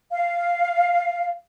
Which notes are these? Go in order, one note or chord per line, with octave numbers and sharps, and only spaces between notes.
F5